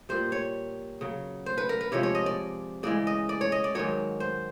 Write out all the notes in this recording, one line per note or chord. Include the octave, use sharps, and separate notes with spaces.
A#2 G3 C5
C#5
C#3 F#3
C5
B4
A#4
B4
C3 F3 G#3 C#5
C#5
D#5
D5
C#3 E3 G#3 D5
D#5
D5
C#5
D#5
D5
G#2 D#3 F#3 C#5
C5